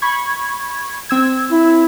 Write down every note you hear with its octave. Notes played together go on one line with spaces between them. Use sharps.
B5 C#6 G#6
C4 E6 G#6
E4